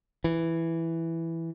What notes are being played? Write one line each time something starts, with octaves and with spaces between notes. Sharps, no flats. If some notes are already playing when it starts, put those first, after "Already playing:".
E3